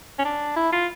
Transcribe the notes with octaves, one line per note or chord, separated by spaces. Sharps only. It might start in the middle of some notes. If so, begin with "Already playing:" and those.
C#4
D4
E4
F4